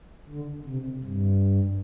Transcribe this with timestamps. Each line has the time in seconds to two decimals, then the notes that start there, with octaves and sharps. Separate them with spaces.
0.28 D3
0.66 C3
1.03 G2